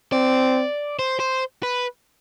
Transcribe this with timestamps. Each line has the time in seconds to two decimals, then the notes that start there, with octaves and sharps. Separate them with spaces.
0.12 C4 D5
0.99 C5
1.20 C5
1.63 B4